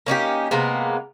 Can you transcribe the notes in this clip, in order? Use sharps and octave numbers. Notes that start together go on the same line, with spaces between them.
A#3 C#4 D#4 G4
C3 G#3 A#3 B3